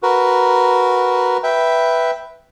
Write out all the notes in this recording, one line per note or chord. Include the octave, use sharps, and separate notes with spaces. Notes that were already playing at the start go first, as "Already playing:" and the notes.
F#4 A#4 B4
B4 E5 G5